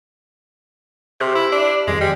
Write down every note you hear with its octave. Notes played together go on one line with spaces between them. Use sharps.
C3 G4 C6 F6
E4
D4
F2 D#3 F3 G#3
G3